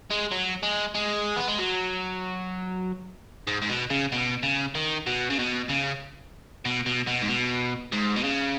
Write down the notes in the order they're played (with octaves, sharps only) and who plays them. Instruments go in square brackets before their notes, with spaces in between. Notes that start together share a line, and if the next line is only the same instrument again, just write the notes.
[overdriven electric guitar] G#3
F#3
G#3
G#3
B3
G#3
F#3
G#2
G#2
B2
C#3
B2
C#3
D#3
B2
C#3
B2
C#3
B2
B2
B2
G#2
B2
G#2
B2
C#3